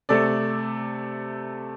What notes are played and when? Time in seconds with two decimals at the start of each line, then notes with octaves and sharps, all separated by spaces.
0.09 C3 A3 A4 D5